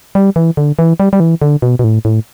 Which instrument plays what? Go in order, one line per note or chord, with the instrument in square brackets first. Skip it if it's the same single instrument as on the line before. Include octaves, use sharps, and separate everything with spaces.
[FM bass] G3
E3
D3
E3
G3
G3
E3
D3
B2
B2
A2
A2